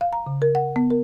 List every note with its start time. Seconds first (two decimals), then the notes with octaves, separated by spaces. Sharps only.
0.01 F5
0.13 A#5
0.27 C#3
0.42 A#4
0.55 F#5
0.76 B3
0.90 A#4